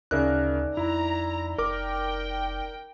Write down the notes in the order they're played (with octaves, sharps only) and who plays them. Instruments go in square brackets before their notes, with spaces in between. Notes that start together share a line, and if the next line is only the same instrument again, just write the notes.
[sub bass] D2 [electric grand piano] C#3 A#4 F#6 [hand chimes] D#4 D5 E5
[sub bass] F2 [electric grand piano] E4 [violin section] A#5
[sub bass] F1 [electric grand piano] A#4 D6 [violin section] G5